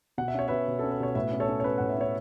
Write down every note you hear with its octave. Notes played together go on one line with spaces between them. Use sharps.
B2 F#5
E5
C#4 C#5
B2 B4 E5
B2
C#4 A4
B4
B2 C#5
A2 B4 E5
C#4
A4 C#5
C#4
C#5
C#4 B4
A2 F#5
E5
C#4 C#5